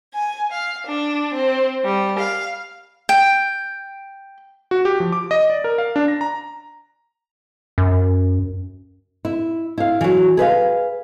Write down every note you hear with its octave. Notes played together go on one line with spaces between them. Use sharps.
G#5
F5
D4
C4
G3
F5
G5
F#4
G4
F3
D6
D#5
D5
A#4
F5
D4
A#6
A#5
F#2
E4
E4 F5
E3 F#3
G#4 B4 E5 F5